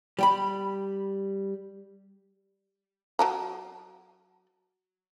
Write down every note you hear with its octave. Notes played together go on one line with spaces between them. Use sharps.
G3 G5 B5
F#3 A5 A#5